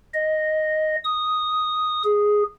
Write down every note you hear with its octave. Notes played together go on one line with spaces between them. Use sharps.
D#5
D#6
G#4